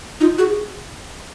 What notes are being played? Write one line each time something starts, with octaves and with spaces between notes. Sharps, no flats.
D#4 F4
F#4 G#4
G#4